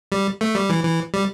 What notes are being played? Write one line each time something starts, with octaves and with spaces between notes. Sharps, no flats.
G3
A3
G3
E3
E3
G3